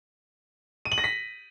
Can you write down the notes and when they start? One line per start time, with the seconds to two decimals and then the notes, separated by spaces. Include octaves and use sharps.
0.85 D#7
0.92 F#7
0.98 A#6
1.04 B6